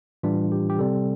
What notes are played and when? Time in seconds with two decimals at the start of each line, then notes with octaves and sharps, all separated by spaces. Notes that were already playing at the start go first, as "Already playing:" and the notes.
0.23 A2 E3 G3 D4 F4
0.52 G4
0.70 G4
0.79 C3 G3 C4 A4